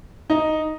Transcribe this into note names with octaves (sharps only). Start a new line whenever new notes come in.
D#4